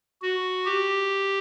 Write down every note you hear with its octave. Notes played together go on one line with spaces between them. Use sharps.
F#4
G4